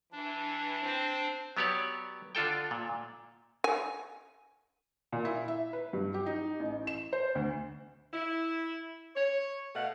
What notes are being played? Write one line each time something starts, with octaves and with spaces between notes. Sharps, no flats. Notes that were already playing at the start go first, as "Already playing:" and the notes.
E3 D4
C4
F#3 B3 G4 C#5 D5
D3 D4 F4 A4 G5
A#2
G#5
A#2
E4
E5
B4
G2
G4
D#4
A1
E7
C5
D2
E4
C#5
B2 A3 F5 F#5